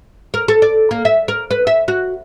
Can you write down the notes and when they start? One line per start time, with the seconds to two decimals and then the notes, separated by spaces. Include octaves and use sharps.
0.34 A#4
0.48 A4
0.62 D5
0.91 A#3
1.05 E5
1.28 A#4
1.51 B4
1.67 E5
1.88 F#4